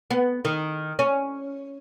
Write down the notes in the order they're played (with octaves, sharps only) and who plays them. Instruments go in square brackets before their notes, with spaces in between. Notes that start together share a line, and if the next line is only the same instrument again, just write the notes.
[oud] B3
D#3
C#4